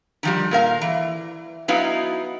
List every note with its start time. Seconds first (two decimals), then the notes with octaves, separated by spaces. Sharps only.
0.23 D#3 F3 G3
0.51 A#2 A#4 F5 A#5
0.81 E3
1.68 F#3 B3 D#4 E4 B4 F5